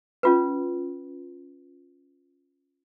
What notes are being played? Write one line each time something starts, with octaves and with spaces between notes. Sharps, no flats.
C#4 F4 B4